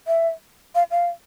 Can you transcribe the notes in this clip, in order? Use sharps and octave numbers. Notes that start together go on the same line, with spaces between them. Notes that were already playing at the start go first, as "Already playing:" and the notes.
E5
F5
F5